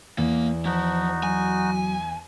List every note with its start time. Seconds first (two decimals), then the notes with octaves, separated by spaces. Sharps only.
0.18 E2 A#3
0.65 F3 D#4 F#4
1.23 F#3 G#5